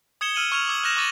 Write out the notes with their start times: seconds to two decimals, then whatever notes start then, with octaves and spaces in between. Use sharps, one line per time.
0.21 D#6 G#6 C#7 E7 G7
0.35 E6 F6 D#7 E7 F#7
0.52 C#6 F6 G#6 F7
0.68 D6 E6 G#6 F#7
0.84 F6 F#6 A#6 E7 F7
0.97 C#6 D6 A6 D#7 F#7